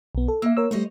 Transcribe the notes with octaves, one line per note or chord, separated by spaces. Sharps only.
B1 B3
A4
A#3 E5 E6
A#4 C#5 E6
G3 A3 C5 C#5 D#5